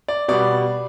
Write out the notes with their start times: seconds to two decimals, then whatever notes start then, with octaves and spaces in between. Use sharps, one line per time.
0.08 D5
0.28 B2 G3 B3 D5